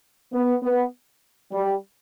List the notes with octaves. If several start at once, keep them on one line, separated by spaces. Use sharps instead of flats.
B3
B3
G3